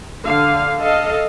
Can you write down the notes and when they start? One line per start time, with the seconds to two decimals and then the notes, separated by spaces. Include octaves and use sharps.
0.24 D3 F5
0.80 A4 D#5 F5